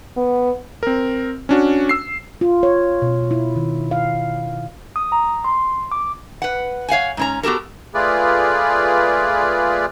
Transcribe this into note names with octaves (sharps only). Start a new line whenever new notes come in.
B3
C4 A#4
C#4 D4 F#4
E6 C7
F4
C#5
B2
E4
D#3
F5
D#6
A#5
C6
D6
B4 F#5
C#5 F5 F#5 G#5
G#2 C#4 A#5
B3 F#4 G4 A4 A#4
A3 F4 G#4 B4 D5